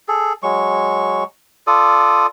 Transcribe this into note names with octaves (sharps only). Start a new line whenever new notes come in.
G#4 A4
F#3 G#3 C#6
F4 A4 D5 D#6